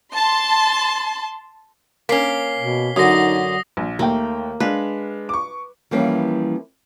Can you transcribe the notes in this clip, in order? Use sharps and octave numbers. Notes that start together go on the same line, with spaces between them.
A5 C6
A#3 C#4 B6 C7 G7
B2
F#2 D3 D#4 D#6 A#6
A#1
D#2 A3 A#3 G5
G#3 D4 B4 F5
C#6 D6
E3 F3 G3 A#3 C#4